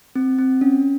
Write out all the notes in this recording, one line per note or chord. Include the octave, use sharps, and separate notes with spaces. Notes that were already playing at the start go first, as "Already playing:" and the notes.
C4
C4
C#4